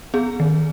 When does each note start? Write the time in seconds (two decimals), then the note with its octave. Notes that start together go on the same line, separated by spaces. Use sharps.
0.14 B3 G#4
0.40 D#3